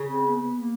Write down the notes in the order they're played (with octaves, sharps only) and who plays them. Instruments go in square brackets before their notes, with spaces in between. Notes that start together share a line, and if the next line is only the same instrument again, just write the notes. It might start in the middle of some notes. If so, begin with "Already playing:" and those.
Already playing: [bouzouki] C#3
[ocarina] C4
B3
B3
A#3